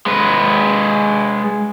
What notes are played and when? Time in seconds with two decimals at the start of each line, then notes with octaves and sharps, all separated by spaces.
0.06 G#3 B4